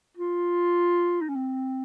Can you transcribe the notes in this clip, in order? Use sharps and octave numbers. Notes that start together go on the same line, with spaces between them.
F4
D#4
C#4
C4